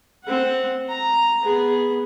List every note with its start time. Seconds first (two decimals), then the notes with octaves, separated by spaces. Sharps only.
0.24 C4 F#5
0.89 A#5
1.42 B3 G#4